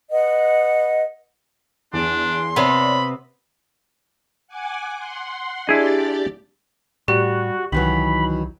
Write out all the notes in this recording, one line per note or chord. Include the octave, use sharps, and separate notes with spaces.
B4 D#5 F#5
E2 D4 G#4 C6
C3 B3 C#5 D5 B5
F#5 G#5 D6
F#5 C6
D4 E4 G4 G#4 D5 D#5 A6
A2 G3 F#4 G4
C2 D#3 E3 F#3 B5